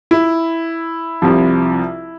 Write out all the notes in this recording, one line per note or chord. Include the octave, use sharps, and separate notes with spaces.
E4
C2 C3 F3